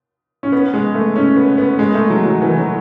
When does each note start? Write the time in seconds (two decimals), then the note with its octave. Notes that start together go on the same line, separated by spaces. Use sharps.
0.43 C#4
0.52 B3
0.74 G#3
0.94 A3
1.16 C#4
1.37 B3
1.58 B3
1.79 G#3
1.94 A3
2.10 F#3
2.26 F#3
2.42 E3
2.58 F#3